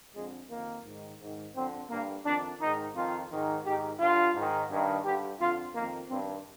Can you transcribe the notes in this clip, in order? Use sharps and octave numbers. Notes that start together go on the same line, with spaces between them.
F2 D3 G#3
F2 D#3 A#3
G#2 D#3
G#2 D#3
F2 D3 C4
G2 D3 A#3
F2 D#3 D4
G#2 D#3 D#4
F2 D#3 F4
G#2 D#3
G#2 D#3 G4
G2 D3 F4
G#2 D#3
G2 D#3
G2 D3 G4
F2 D3 F4
F2 D#3 A#3
G2 D#3 C4